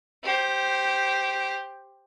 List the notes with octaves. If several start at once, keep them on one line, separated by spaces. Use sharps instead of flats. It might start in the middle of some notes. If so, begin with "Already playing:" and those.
G4 C5